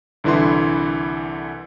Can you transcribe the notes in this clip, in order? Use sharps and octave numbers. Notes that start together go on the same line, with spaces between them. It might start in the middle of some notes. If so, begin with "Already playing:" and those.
C2 D3 E3 E4 C6